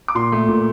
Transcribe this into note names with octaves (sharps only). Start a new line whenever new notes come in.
D6
A#2 C6
A3
A#2